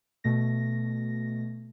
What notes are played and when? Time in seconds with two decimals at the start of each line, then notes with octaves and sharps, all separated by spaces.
0.24 B2 A3 A#6